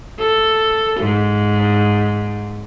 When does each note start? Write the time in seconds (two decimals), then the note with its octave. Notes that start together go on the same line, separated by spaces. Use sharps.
0.19 A4
1.00 G#2